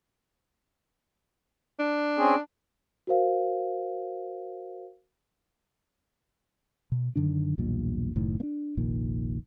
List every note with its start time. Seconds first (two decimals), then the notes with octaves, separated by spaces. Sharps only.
1.79 D4
2.18 C4 C#4 G#4
3.07 F#4 A#4 C5 F5
6.92 B2
7.16 F#2 D3 D#3 D4
7.58 B1 E2 G2 A#2
8.16 F#1 A2 D#3
8.40 A#3 D4
8.77 F1 A#1 A#2 D#3